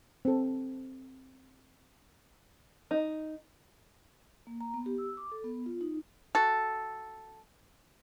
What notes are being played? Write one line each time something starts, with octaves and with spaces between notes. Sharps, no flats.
C4 A4
D#4
A#3
A#5
B3
G4
E6
D6
A4
B3
F4
D#4
F#4 A4